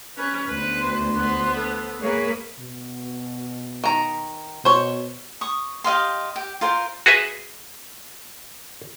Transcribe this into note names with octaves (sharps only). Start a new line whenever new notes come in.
C#4 B4 B5
D2 B3 B4 C5
C6
B3 B4 C5
A4
A#3 G#4 B4 C#5
B2
D#3 A#5
B2 C5 C#5
C#6 D#6
G4 D#5 F5 C6
G4
F4 A#4 C5
F#4 G#4 B4 E5